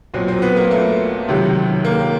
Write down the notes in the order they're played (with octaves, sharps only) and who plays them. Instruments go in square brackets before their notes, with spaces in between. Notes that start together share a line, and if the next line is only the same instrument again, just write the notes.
[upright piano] B1 A#2 F#3 C4
C4
B3
A#3
A3
C#2 C3 D#3 F#3
A#3